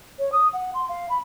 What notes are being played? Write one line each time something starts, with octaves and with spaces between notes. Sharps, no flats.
C#5
D#6
F#5
C6
F5
B5